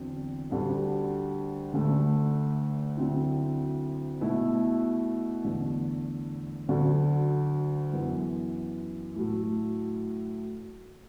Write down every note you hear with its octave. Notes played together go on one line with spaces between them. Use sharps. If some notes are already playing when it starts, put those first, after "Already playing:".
Already playing: E2 D3 F#3 C4
D2 D3 G3 D4
D2 D3 A3
D2 D3 F#3 C4 E4
B2 A3 E4
E2 D3 A3
D2 D3 F#3
F#2 E3 B3
A2 F#3 A3